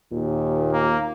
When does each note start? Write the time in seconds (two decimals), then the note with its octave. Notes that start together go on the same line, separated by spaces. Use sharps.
0.12 D#2 A#2
0.73 A#3